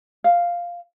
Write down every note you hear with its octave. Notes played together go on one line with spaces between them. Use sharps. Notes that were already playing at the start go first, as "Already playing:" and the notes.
F5